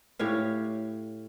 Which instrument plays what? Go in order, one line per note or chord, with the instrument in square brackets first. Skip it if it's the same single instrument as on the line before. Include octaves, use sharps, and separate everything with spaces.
[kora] A2 G4 C#5 F5